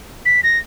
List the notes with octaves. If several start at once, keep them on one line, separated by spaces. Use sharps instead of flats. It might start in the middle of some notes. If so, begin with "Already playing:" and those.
B6
A#6